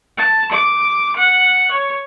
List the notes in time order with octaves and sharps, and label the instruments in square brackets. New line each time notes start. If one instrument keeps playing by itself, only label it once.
[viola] A5
D6
F#5
C#5